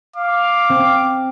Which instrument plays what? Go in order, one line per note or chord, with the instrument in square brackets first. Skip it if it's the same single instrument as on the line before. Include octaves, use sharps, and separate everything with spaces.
[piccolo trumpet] F5 [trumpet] D6
[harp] C4